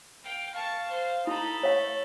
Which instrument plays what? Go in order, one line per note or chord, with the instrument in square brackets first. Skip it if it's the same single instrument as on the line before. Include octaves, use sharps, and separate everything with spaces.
[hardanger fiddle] F5 G5
[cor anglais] F5 [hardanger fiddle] A5 C#6
[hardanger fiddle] C5
[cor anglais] D#4 [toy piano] E4 [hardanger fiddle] A4 B5
[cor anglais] A3 [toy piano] C#5 F5